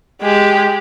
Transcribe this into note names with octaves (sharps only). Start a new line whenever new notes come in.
G#3 G4